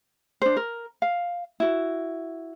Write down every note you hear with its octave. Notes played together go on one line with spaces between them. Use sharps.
D4 C5
A#4
F5
E4 F#4